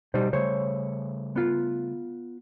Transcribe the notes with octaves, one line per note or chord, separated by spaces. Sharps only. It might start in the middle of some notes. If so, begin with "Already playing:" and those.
B2 G3 D#4 C5
C#3 G3 A3 C5 C#5
B3 F4